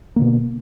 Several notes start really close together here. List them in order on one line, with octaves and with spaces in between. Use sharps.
A#3 D3 B2